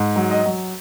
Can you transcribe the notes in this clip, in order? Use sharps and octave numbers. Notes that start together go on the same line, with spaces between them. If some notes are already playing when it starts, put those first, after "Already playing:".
Already playing: G#2
F#3
D#5
F#3